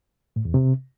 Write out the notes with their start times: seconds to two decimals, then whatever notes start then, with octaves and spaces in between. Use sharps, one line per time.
0.36 A2
0.45 E2
0.54 C3